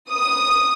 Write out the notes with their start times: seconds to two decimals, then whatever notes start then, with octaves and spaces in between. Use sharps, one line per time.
0.10 D#6